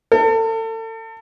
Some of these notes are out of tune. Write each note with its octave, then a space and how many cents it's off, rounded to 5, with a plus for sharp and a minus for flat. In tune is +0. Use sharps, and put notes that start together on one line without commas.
A4 +35